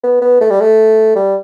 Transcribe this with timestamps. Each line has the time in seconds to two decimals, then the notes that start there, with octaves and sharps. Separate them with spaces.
0.03 B3
0.21 B3
0.41 A3
0.50 G3
0.61 A3
1.16 G3